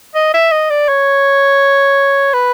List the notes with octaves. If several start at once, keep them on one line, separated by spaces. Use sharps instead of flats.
D#5
E5
D#5
D5
C#5
B4